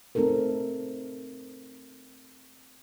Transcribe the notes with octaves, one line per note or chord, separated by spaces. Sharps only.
A3 C4 D#4 A4 A#4